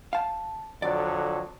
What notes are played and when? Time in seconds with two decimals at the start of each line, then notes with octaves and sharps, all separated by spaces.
0.13 F5 A5
0.82 F2 D3 F#3 D5